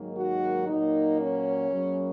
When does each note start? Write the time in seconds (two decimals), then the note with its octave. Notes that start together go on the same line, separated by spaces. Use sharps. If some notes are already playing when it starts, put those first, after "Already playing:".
Already playing: G#2 D#3 F#3 A#3
0.15 F#4
0.66 A#2 F#3 A#3 D#4
1.18 C#4
1.70 F#2 C#3 F#3 A#3